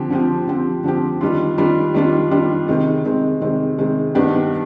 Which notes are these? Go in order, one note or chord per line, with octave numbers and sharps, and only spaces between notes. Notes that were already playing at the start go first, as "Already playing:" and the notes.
Already playing: D3 F3 C4 G4
D3 F3 C4 G4
D3 F3 C4 G4
D3 F3 C4 G4
D#3 G3 D4 F4
D#3 G3 D4 F4
D#3 G3 D4 F4
D#3 G3 D4 F4
C3 D#3 G#3 C4
C3 D#3 G#3 C4
C3 D#3 G#3 C4
C3 D#3 G#3 C4
G2 D#3 B3 D4 G4